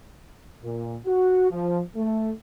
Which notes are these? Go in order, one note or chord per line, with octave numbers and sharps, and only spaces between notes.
A#2
F#4
F3
A3